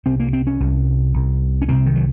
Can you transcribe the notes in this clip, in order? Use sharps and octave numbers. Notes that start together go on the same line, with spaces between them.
C2 C3 C4
A#3
C4
C#4
C2 C3
C2 C3
C#4
C2 C3 C4
D#3
F#3